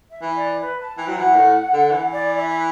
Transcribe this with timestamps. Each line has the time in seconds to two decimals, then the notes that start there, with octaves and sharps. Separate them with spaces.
0.10 E5
0.22 E3
0.35 D5
0.60 B4
0.80 A5
0.98 E3 G5
1.08 F#3
1.16 E3 F#5
1.36 A2
1.74 D3
1.92 E3
2.11 D5
2.36 E5